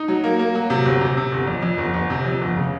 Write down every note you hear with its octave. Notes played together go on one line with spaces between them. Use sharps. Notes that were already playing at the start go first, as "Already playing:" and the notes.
Already playing: D#4
F#3
A#3
A#3
F#3
C3
G1
C3
C3
G1
F2
F2
G1
G1
C3
F2
G1
C#3